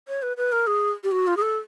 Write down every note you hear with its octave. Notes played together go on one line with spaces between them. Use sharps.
C#5
B4
B4
A#4
G#4
G4
F#4
F4
G#4
A4